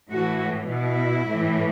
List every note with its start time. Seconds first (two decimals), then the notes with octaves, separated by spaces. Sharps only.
0.11 A2 E3 F#4
0.69 B2 E4
1.29 A2 E3